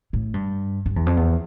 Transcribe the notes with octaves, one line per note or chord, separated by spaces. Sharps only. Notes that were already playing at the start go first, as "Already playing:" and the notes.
A2
G2
G2
E2
F2
E2